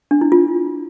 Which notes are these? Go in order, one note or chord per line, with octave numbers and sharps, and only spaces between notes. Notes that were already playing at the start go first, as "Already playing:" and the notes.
D4
E4
F4